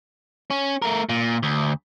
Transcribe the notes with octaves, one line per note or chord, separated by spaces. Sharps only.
C#4
A3 A#4
A#2
D2